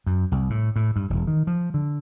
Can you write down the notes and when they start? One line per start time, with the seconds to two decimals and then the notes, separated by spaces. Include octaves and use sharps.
0.07 F#2
0.32 C2
0.50 A2
0.76 A2
0.96 G2
1.10 E1
1.27 D#3
1.47 F3
1.74 D3